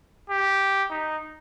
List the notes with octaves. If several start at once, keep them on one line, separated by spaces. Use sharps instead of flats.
G4
D#4